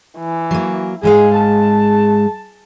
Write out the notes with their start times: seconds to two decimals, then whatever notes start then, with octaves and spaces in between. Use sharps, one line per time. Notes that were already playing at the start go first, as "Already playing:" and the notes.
0.19 E3
0.51 F#3 A#3
1.03 G#2 G#3 G#4 F5
1.36 A5